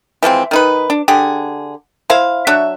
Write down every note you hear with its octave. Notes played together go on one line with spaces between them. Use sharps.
E3 F3 G#3 C4
D#3 D#4 B4
D4
D3 G4 G#4
E4 C5 F5
F#3 D4 C#5 E5